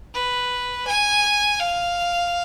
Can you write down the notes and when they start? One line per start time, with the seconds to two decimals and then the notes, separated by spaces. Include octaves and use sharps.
0.14 B4
0.87 G#5
1.59 F5